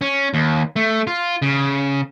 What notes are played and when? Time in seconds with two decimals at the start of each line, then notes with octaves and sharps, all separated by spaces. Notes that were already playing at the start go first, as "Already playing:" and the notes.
0.01 C#4
0.34 D#2
0.76 A3
1.07 F4
1.42 C#3